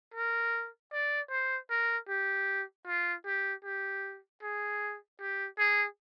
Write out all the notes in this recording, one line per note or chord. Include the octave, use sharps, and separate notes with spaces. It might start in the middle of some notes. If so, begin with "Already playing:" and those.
A#4
D5
C5
A#4
G4
F4
G4
G4
G#4
G4
G#4